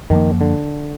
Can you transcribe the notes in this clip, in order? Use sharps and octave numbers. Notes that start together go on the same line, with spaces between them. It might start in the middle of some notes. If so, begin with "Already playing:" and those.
F#2 D#3 F3 A#3
D3